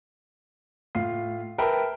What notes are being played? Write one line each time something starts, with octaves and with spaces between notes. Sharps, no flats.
A2 F4 F5 C7
A#4 B4 E5 G5 A5 B5